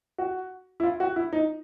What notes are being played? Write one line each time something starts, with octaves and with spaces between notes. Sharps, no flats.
F#4
E4
F4
F#4
E4
D#4